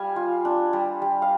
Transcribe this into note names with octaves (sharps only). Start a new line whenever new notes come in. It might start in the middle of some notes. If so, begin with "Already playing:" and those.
Already playing: G3 F5 G#5
F4
D4
G3
G3
F5